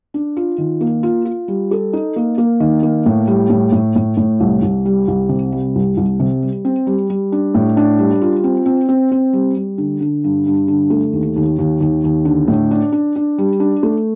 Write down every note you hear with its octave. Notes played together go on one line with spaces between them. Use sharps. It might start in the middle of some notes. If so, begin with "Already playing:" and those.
D4
F4
D#3
A#3
F4
F4
G3
A4
D#4
A#3
A#3
D#3
A#3
A2
G3
A2
A2
A2
A2
C2
C2
G3
C2
C3
G3
C2
C2
C3
G3
C4
G3
G3
D4
A2
D4
G3
F4
C4
C4
C4
C4
G3
G3
D3
D3
G2
G2
D3
A3
D#2
D#2
D#2
D#2
D#2
D3
A2
D4
D4
D4
G3
D4
A3